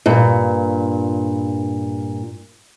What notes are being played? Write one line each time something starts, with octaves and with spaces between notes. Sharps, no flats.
G2 A#2